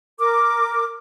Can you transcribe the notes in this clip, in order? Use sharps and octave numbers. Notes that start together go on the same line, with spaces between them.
A#4 D6